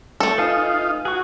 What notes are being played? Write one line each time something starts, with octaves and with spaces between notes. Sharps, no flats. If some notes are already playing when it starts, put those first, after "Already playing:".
A3 A4
D#4 F4 B4 F5 G#5
F#4 G#4 C#6